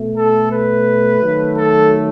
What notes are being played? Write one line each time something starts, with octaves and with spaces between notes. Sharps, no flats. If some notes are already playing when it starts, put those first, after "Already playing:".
Already playing: B2 A3
A4
B4
D#3 F#3 A3
A4